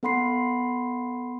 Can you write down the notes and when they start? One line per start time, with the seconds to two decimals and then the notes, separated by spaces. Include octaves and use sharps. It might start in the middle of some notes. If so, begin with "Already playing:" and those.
0.03 B3 A4 F#5 B5 C6 C7